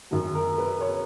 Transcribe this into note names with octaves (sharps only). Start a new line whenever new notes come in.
F#2 D#3 F#3
A#4
B4
C#5